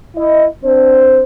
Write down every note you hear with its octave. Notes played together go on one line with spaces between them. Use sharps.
E4 D#5
C4 D4 C5